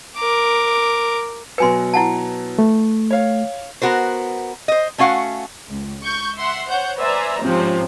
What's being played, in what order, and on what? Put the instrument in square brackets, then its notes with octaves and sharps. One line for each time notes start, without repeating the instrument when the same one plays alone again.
[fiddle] A#4 D6
[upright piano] B2 F#3 C#7 [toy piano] B4 G#5 C6
[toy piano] E4 F#5 A5
[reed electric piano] A3
[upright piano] C#5 F5
[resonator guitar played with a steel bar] B3 F#4 A#4 C5
C5 D#5
A3 C#4 F#4 F5 F#5
[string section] C#2
C#6 G6
E5 F#5 C6
C5 C#5 F#5 G6
B4 C5 D5 E5 G#5 A#5
G#2 C3 F3 C4 C#4